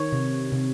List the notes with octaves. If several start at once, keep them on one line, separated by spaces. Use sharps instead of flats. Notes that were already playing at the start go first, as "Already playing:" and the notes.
Already playing: D#3 C#5
C3
C3